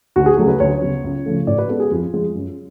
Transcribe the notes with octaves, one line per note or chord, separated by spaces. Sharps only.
D2 F#4
G#4
C#3 F#3 A3 G#4
B4
D2 C#5
C#3 F#3 B3
C#2
C#3 F3 A3
A2 D5
B4
G#3 B3 A4
G#4
F2 F4
F3 G#3
F#2